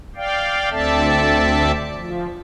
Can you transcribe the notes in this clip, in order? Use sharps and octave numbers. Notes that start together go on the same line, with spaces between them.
D5 F5 G5
D2 C4 A4 D5 E5 A5
F3